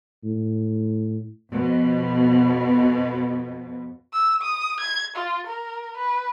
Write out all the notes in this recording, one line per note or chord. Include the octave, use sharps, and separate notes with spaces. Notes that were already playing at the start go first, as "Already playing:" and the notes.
A2
F2 B2
E6
D#6
G#6
F4
A#4
B4